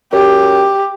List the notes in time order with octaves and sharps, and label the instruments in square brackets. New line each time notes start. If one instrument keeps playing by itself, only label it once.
[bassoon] F#2 [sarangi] G4